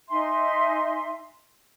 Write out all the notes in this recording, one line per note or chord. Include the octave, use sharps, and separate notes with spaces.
D#4 E5 G#5 C6